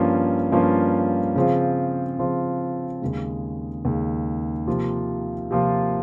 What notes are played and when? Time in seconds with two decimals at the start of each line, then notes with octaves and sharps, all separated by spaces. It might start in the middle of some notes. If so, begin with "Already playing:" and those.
Already playing: G2 F3 A#3 C#4 F4
0.52 G2 F3 A#3 C#4 F4
1.36 C#3 F3 C4 F4
2.19 C#3 F3 C4 F4
3.02 D#2 C#3 G#3
3.85 D#2 C#3 G#3
4.67 C3 F3 A#3 F4
5.51 C3 F3 A#3 F4